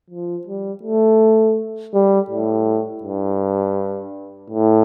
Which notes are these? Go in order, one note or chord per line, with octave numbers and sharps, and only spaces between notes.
F3
G3
A3
G3
A2
G2
A2